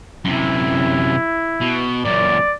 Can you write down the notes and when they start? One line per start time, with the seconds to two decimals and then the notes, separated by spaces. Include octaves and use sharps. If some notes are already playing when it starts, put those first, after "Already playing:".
0.25 F#2 C3 E4
1.61 B2
2.05 F#2 A#2 D5